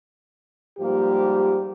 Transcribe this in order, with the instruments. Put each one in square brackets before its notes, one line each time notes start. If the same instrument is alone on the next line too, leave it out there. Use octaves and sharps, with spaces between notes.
[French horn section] G#2 F3 G3 A#3 G4